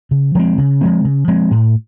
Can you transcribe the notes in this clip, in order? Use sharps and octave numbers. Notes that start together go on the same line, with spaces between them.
C#3
F3 G#3 C4
C#3
F3 G#3 C4
C#3
F3 G#3 C4
A2